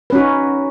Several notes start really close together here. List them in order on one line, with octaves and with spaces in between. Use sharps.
B4 C#4 F#4 D#4